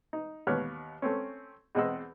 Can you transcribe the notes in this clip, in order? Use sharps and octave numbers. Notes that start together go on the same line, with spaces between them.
D#4
D#2 B3 B4 C#5 F6
A3 C4 C#4
E2 G#3 C4 D#5 F#5 E6